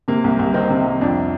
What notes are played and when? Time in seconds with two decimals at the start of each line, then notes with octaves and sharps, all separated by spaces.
0.08 C3 A#3
0.24 C2
0.39 C2
0.54 D#3 C4
0.70 C3
0.86 C2
1.01 F2 D4